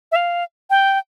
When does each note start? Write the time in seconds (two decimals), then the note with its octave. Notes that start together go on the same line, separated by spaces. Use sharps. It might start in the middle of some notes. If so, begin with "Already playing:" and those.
0.12 E5
0.16 F5
0.70 G5